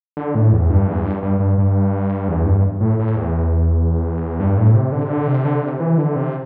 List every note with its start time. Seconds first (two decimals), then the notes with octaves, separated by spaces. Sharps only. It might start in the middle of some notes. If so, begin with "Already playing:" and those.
0.17 D3
0.35 A2
0.52 E2
0.70 G2
0.88 E2
1.05 G2
1.23 G2
1.40 G2
1.58 G2
2.28 E2
2.46 G2
2.80 A2
2.99 A2
3.16 E2
4.40 G2
4.57 A2
4.75 C3
4.92 D3
5.05 C3
5.10 D3
5.28 C3
5.45 D3
5.63 C3
5.80 E3
5.98 D3
6.16 C3